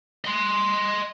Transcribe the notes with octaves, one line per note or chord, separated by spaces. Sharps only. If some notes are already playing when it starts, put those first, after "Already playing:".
D#5 C6